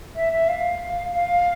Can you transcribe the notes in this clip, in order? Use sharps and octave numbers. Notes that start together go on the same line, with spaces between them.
E5
E5
F5
F5